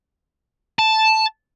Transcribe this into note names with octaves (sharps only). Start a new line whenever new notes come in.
A5